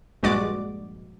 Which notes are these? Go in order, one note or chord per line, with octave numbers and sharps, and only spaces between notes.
A#1 G2 G#3 F#4 D5 D6